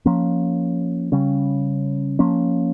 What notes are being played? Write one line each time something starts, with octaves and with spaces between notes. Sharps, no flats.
F3 A#3 C#4
C#3 G3 C#4
F3 A#3 C#4